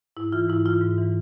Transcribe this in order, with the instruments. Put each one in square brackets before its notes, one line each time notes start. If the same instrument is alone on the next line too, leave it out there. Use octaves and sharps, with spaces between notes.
[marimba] G#2 E4
E3 F4
G#2 E4
E3 F4
G#2
E3